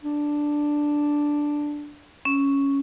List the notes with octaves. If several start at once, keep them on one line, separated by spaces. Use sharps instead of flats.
D4
C#4